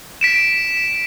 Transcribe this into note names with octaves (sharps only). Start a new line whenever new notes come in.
B6 D7 E7